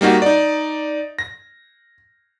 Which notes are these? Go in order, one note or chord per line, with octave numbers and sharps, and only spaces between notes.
G3 A#3 D#4 F#4
D#4 D5
A#6